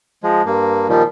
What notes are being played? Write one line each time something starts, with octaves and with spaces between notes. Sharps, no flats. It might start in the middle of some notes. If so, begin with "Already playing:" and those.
F3 G#3
G2 A#3
A#2 D#3 F3 G3